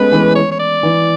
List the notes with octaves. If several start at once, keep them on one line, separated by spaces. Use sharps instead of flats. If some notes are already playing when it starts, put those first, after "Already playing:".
Already playing: G#3 A3 B3 C#4 B4
E3 G#3
C#5
C#5
D5
E3